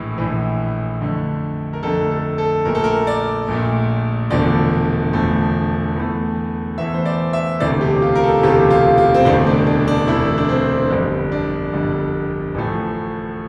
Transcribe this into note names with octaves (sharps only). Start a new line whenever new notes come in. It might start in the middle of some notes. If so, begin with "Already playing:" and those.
Already playing: A#1 A2 E3
A#1 A2 E3
F2 D3 A3
A#4
F2 D3 A3 A4
A4
A4
A#1 A#2 A3 A#4
A4
A#4
D5
A#1 A#2 A3
E1 E2 D3 F3 A3 D5
E1 E2 D3 F3 A3
E2 E3 A3
E2 E3 A3 E5
C5
D5
E5
E1 D2 C3 E3 A3 D5
G4
F4
A#4
A4
E1 D2 C3 E3 A3 G4
F4
F4
C4
E1 D2 C3 E3 A3 D4
D4
D4
D4
E1 D2 C3 E3 A3 E4
D4
C4
G1 F2 D3 G3
D4
G1 F2 D3 G3
A1 A2 F3 A3